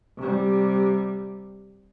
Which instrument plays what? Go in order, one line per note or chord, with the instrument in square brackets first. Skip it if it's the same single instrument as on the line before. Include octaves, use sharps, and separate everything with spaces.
[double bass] C3 G3